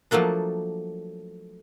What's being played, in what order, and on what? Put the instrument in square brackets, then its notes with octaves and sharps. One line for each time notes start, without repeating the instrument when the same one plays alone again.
[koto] F3 F#3 A3 A#3 D4